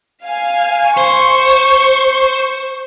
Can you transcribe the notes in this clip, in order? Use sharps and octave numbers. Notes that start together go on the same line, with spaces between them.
F5 G#5
C5 C#6